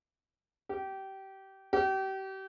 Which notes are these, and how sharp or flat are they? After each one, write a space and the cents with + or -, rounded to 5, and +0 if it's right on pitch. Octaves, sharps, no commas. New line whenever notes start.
G4 -25
G4 -35